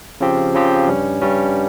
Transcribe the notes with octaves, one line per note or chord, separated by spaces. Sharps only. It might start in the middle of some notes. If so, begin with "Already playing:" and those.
C#3 F3 C4 G4
C#3 F3 C4 G4
G2 G3 C#4
G2 G3 C#4